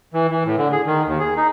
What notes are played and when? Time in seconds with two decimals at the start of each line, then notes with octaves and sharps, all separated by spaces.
0.14 E3
0.30 E3
0.45 A2
0.58 D3
0.72 G#4
0.86 D#3
1.06 D#2
1.20 G#4
1.37 D#4